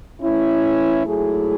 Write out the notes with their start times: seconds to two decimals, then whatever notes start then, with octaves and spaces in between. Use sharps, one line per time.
0.22 A2 E3 A3 C#4 E4
1.06 G#2 F#3 A3 E4 G#4